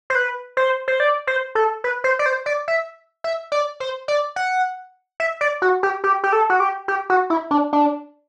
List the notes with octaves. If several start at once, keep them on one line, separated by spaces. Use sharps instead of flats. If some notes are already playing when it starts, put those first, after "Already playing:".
C5
B4
C5
C5
D5
C5
A4
B4
C5
D5
C5
D5
E5
E5
D5
C5
D5
F#5
E5
D5
F#4
G4
G4
G4
A4
F#4
G4
G4
F#4
E4
D4
D4